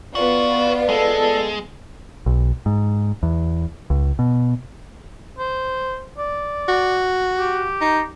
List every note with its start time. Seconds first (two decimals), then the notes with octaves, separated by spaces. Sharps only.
0.15 B3 F4 F#4 D5
0.89 G#3 A4
2.26 B1
2.66 G#2
3.23 E2
3.90 C#2
4.19 B2
5.39 C5
6.18 D5
6.68 F#4
7.38 G4
7.81 D#4